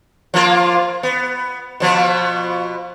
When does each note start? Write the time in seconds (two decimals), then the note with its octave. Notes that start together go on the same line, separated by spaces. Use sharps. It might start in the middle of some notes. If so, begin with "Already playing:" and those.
0.34 F3 A#3 F4
1.03 B3
1.80 B2 F3 B3